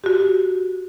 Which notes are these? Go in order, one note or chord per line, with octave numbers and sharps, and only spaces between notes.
F#4 G4